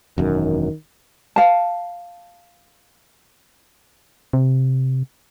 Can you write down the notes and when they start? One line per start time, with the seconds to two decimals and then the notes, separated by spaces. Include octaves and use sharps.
0.18 E1 F#2 D#3
1.36 F5 A5
4.33 C3